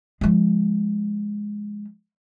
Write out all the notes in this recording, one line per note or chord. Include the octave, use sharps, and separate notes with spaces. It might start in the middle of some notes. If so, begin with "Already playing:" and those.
F3 G#3